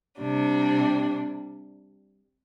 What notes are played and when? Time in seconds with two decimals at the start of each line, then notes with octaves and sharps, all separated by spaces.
0.20 C3 G3 D4